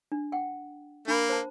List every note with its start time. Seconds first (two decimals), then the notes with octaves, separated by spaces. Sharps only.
0.12 D4
0.32 F#5 G5
1.08 A#3 D4 B5
1.29 C5 A5